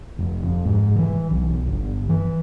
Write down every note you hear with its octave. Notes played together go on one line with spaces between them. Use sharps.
F1
F2
G#2
E3
B1
G1
E3